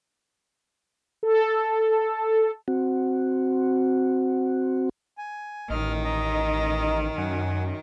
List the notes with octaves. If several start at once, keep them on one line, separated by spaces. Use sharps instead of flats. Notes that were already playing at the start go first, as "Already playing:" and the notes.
A4
C4 F#4
G#5
A1 D#3 D#5 F6
D#5 A#5
F#2 F#5 G#5